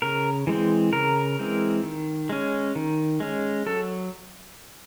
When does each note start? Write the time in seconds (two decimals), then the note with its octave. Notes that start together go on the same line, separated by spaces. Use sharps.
0.02 C#3 A#4
0.47 E3 G#3 C4
0.93 C#3 A#4
1.39 E3 G#3 C4
1.83 D#3
2.29 G#3 C#4
2.76 D#3
3.20 G#3 C#4
3.66 F#3 A4